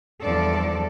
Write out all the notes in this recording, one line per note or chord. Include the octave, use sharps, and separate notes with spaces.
E2 G2 F3 C4 A4 D5